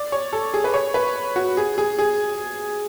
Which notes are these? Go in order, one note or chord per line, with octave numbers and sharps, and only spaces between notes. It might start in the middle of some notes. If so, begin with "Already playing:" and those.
Already playing: D5
C#5
A4
G#4
B4
C#5
B4
F#4
G#4
G#4
G#4